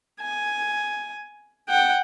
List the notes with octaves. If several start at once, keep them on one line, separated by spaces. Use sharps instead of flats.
G#5
F#5 G5